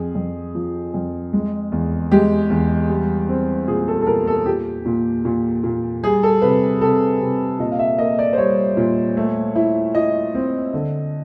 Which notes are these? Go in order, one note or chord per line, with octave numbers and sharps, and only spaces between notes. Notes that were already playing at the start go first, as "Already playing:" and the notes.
Already playing: F2 G#4
F2
F3
F2
G#3
E2
G#3 G4
E2
G3
C4
A#2 G#4
A4
A4
A#2 A#4
A4
A#2 G4
A#2
A#2
A#2
G3 G#4
A4
C3 B4
C3 A4
C3
A#2 D#5
F5
E5
A#3 D#5
D5
C5
G3 C#5
A#2
A3
E4
E4 D#5
C4
D3